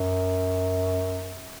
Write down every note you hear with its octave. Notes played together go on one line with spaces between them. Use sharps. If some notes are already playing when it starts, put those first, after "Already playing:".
Already playing: F#2